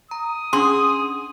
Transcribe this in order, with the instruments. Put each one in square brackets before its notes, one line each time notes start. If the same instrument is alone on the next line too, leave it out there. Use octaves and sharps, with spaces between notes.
[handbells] A#5 [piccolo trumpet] D#6
[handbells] C#4 D4 [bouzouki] G#4 [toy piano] C6